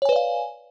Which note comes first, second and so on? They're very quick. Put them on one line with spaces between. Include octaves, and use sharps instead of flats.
C#5 G#5 B4 D5 F5